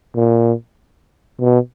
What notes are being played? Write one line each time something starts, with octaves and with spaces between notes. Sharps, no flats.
A#2
B2